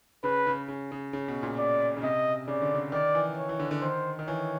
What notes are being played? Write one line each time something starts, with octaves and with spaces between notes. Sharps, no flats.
C#3 B4
C#3
C#3
C#3
C#3
B2
A#2
D5
C#3
C3 D#5
C#3 D5
D3
C#3
D#3 D5
E3
C#5
E3
D3
D3
D#3 C5
D#3
E3 C#5